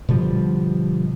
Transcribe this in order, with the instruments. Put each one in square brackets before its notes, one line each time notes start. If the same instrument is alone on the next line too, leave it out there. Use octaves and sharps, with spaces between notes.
[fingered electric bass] B2 D3 F3 G3